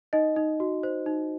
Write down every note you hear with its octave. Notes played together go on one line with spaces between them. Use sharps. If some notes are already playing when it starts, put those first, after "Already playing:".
D#4 D#5
D#4
F#4
C5
D#4